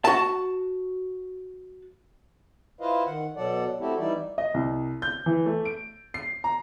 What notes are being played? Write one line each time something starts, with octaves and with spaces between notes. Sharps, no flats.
F#4 A5
E4 F4 B4 C5 D#5 F5
D#3 F#5
B2 F#3 A4 D5 F#5
A3 C4 E4 F#4 G4 A4
E3 G3 D#4 E4 D5
D#5
C2
G6
E3
A3
D7
C7
A#5